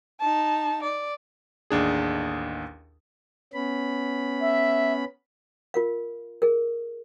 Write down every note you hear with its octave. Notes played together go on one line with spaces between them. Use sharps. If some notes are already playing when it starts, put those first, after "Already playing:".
D#4 A5
D5
A1 D#2 D4 G#4
B3 C#4 B5
E5
F4 A#4 F5
G#4 A#4